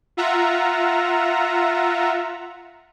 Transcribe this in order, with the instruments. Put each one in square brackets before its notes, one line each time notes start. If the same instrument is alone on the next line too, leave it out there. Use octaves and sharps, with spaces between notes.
[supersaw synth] F4 E5 F#5 A#5